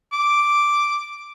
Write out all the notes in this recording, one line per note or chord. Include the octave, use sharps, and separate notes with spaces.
D6